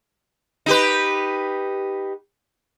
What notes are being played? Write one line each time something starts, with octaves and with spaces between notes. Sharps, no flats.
D#4 G4 B4